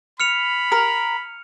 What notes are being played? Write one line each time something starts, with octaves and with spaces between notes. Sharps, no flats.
B5 F6 C#7 F7
A#4